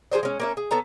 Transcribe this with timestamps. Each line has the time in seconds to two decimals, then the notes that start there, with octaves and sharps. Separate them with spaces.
0.12 F3 G#4 C5 D5
0.23 G#3 C#4
0.40 A#3 C#4 E5
0.57 G#4
0.71 B3 A4 C#5 A#5